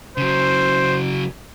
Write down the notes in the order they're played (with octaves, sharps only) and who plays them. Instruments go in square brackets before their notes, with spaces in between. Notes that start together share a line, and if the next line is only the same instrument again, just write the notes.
[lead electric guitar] C#3 F#3 [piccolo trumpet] C5